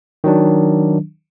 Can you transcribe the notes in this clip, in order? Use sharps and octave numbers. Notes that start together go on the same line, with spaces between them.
D#3 F#3 D4